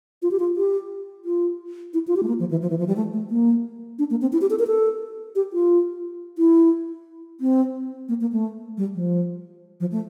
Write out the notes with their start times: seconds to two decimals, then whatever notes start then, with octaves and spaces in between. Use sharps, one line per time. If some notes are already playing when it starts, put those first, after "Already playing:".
0.22 F4
0.31 G4
0.39 F4
0.57 G4
1.25 F4
1.94 E4
2.07 F4
2.16 G4
2.23 A3
2.28 A#3
2.40 F3
2.51 E3
2.62 F3
2.70 E3
2.79 F3
2.88 G3
2.96 A3
3.13 A3
3.30 A#3
3.99 D4
4.11 A#3
4.22 C4
4.33 E4
4.41 G4
4.50 A4
4.59 A#4
4.67 A4
5.36 G4
5.53 F4
6.38 E4
7.41 C4
8.09 A#3
8.21 A#3
8.32 A3
8.78 G3
8.95 F3
9.80 F3
9.92 A3